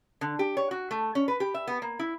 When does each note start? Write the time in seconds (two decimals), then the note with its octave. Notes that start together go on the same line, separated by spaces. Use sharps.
0.21 D3
0.39 G4
0.57 C#5
0.71 F#4
0.91 A3
1.15 C#4
1.28 B4
1.40 G4
1.54 E5
1.67 B3
1.82 A#3
1.99 E4